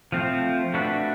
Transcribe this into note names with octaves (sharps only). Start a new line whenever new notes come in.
F3 A3 C4
A3 D4 F#4 B4